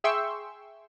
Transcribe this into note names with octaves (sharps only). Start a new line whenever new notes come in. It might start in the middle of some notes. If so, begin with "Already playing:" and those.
G#4 E5 G5 C6 C#6 E6